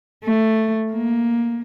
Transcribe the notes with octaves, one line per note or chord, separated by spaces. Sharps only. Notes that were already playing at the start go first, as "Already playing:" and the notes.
A3
A#3